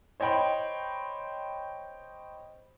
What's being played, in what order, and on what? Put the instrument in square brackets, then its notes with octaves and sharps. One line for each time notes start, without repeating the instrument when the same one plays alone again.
[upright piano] C5 C#5 D#5 G5 B5